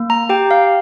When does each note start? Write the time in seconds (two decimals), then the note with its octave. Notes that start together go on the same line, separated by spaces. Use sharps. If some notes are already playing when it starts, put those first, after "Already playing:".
Already playing: A#3
0.10 A#5
0.29 G4 G5
0.51 F5